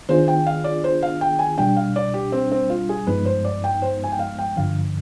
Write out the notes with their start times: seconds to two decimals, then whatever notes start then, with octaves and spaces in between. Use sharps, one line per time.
0.09 D#3 B3 D4 F4 G#4 C5
0.28 G5
0.46 F5
0.64 D5
0.84 C5
1.03 F5
1.21 G5
1.39 G#5
1.58 B2 G3 D4 G5
1.77 F5
1.96 D5
2.14 G4
2.32 C4
2.52 C4
2.70 F4
2.89 G#4
3.07 G2 F3 G#3 B3 D#4 B4
3.25 C5
3.45 D5
3.64 G5
3.82 C5
4.04 G#5
4.12 G5
4.19 F5
4.39 G5
4.57 G2 D3 F3 F5